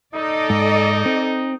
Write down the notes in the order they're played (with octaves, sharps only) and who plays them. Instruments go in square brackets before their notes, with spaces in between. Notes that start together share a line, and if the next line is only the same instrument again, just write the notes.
[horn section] D#4 [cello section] A4 D5 D#5
[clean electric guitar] G#2
C4